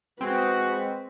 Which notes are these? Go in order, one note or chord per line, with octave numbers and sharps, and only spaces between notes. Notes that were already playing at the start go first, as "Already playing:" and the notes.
G#3 C4 F#4 B4